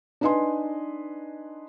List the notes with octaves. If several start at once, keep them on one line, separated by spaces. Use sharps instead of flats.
D4 D#4 B4 D#5 G#5 C6